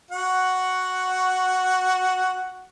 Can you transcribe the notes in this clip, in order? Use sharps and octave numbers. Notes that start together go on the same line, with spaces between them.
F#4 F#5